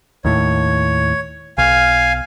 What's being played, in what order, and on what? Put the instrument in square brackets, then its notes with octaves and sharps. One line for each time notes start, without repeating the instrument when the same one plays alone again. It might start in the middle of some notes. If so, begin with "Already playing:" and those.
[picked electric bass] D#2 A2 [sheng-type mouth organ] C#5
[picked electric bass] B1 [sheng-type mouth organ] F5 G#5